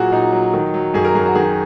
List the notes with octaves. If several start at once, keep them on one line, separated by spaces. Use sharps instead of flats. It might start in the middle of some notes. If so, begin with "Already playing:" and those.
Already playing: A#2 F#3 F#4 G#4
A#2 D#4
F#3
D#3
F#3
F#2 G#4
A#4
F#2 G#4
F#4
D#3 G#4